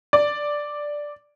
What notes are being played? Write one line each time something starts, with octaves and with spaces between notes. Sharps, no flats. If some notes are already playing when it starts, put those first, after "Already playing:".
D5